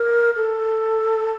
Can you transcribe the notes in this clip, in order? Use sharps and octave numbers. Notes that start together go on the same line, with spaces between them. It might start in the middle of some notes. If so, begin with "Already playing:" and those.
Already playing: A#4
A4